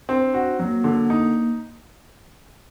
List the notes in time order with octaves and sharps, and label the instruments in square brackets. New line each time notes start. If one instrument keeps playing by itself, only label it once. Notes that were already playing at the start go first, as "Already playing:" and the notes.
[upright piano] C4 [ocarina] D4
[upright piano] F#4
[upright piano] F#3 [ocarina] A#3
[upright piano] D3
D#4